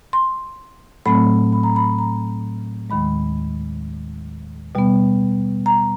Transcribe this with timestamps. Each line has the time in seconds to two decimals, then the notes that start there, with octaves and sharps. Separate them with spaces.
0.13 C6
1.06 A2 F#3 A3 C4 B5
1.52 B5
1.63 A#5
1.76 B5
1.99 A#5
2.90 D#2 D#3 G#3 B5
4.75 B2 G3 B3
5.66 A#5